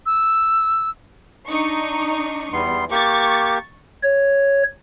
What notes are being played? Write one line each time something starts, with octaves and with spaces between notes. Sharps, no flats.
E6
D4 D#4 C#6
E2 G3 B3 C6
A#3 G4 C#6 A6
C#5